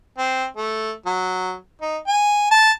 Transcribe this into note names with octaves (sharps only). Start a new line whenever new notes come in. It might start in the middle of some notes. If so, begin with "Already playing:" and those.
C4
A3
F#3
D#4
G#5
A5